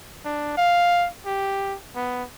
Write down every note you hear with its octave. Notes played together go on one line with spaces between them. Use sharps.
D4
F5
G4
B3